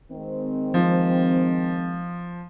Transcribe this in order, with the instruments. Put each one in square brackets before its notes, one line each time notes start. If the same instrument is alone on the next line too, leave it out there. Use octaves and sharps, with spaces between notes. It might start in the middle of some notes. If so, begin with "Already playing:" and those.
[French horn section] D#3 G#3 C4
[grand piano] F3